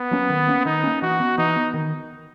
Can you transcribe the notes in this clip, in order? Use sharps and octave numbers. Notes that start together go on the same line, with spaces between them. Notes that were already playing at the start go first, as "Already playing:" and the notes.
Already playing: B3
F#3 A#3 C#4
D#3
A#3 C#4
D#3 D#4
A#3 C#4
E3 F#4
B3
E3 D#4
B3
D#3